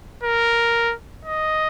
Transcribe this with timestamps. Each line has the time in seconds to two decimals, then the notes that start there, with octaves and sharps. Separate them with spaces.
0.24 A#4
1.25 D#5